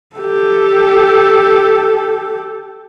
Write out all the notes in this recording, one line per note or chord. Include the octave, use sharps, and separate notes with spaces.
G4 A4